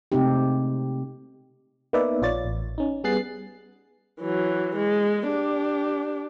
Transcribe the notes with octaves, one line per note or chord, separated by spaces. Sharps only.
C3 G#3 A3 C4 D#4 G4
A#3 B3 D#4 B4 D5 E5
A#1 F4 C#5 D5 A6
A1
C#4 D#4
G3 B3 G#4 F#6 A6 C7
E3 F#3
G#3
D4 G4